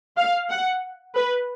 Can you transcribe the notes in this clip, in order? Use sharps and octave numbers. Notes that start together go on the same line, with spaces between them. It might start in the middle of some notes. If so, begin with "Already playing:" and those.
F5
F#5
B4